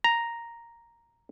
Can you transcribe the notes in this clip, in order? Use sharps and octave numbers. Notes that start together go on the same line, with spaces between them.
A#5